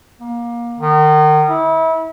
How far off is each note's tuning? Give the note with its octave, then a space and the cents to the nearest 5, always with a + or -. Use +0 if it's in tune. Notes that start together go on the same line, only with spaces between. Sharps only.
A#3 +25
D#3 -30
E4 -30